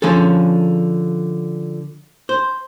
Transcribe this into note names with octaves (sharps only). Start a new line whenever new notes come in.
D3 F3 C#4 G#4 A4
C5